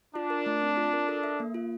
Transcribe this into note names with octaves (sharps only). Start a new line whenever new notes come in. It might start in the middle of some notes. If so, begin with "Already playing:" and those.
D4 F4
A#4
A3
C4
F4
A#4
A4
E5
A#3
F4